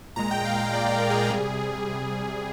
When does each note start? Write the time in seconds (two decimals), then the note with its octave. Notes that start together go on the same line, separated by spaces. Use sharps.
0.16 A#2 G#3 A#5
0.31 G5
0.45 F5
0.58 F5
0.73 D5
0.92 A#4
1.10 G#4
1.30 C3 G3